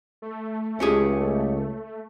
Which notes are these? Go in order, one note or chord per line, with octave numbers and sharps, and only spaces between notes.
A3
C#2 A3 C#4 G4 G#4